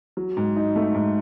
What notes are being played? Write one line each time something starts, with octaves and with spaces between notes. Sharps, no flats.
F#3
G#2
D#4
A3
G#2